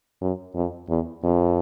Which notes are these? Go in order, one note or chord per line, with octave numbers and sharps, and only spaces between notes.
F#2
F2
E2
F2